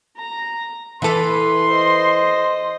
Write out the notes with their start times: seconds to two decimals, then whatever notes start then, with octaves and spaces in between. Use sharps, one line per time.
0.17 A#5
1.02 E3 A4 B4 C6
1.69 C5 D#5